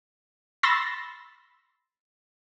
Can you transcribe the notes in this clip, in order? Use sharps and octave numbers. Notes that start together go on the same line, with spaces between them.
B5 C6 E6 A6 A#6